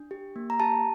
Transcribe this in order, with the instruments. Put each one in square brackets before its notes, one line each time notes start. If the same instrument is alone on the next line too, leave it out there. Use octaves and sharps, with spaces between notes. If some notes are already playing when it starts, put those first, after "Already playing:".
Already playing: [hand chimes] D4
G4
A#3
A#5
G4 A5